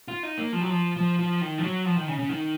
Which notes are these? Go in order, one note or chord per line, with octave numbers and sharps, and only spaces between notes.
F4
D#4
A#3
F3
F#3
F3
F3
F3
D#3
F3
F#3
F3
D#3
C#3
C#3
D#3